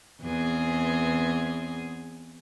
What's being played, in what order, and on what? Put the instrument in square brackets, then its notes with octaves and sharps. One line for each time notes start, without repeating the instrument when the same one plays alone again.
[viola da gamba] E2 C4 G#4